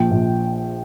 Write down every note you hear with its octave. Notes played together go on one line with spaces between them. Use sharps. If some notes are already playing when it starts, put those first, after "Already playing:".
Already playing: A#1 F3 G5
A#1